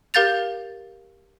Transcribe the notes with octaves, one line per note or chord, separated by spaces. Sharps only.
G4 A#4 F5 G6 A6 F7